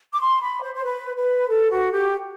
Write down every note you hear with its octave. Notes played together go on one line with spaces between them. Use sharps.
D6
C6
B5
C5
C5
B4
B4
A4
F#4
G4